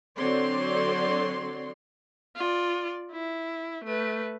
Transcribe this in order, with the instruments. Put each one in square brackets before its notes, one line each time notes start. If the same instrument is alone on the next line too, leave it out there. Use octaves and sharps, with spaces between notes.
[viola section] D3 F#3 C4 C#5 D5 C6
[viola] F4 D5
E4
A3 B4